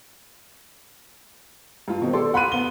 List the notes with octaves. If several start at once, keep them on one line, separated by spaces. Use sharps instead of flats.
G2 F4
B2 D#3 C4
G4 A4 D5 C6
F#5 B5 C6 F#6 D#7
B3 G7